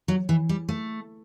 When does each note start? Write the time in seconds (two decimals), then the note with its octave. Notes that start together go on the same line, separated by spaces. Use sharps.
0.08 F#3
0.29 E3
0.49 G3
0.69 A3